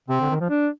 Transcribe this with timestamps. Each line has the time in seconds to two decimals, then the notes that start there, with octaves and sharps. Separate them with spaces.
0.09 C3 C4
0.20 D3
0.30 D#3
0.40 F3
0.50 D4